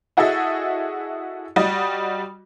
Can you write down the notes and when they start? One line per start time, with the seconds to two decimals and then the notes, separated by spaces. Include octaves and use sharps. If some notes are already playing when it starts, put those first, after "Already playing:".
0.17 E4 F#4 G#4 A4 D#5 E5
1.56 G3 F#4 D#5